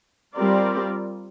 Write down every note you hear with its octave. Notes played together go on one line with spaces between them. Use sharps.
G3 C4 F4 A#4 D5